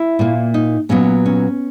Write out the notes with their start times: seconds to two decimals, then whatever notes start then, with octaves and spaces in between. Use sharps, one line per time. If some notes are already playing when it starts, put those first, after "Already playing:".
Already playing: E4
0.19 A#2 A#3
0.54 D#4
0.89 A#2 F#3 B3 C#4
1.26 C#4